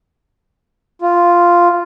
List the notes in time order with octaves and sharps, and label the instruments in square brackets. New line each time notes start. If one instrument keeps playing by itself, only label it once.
[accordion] F4